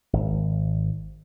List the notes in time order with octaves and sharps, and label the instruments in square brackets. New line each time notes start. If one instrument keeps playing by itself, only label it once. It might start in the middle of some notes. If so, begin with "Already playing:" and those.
[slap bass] G#1